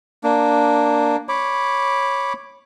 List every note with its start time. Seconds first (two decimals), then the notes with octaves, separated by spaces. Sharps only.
0.24 A#3 D4
1.29 C#5 B5 D6